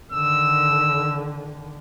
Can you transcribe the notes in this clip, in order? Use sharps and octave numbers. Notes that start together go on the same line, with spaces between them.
D3 D#3 E6